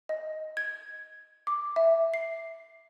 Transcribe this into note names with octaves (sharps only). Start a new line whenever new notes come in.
D#5
G#6
D6
E5
C7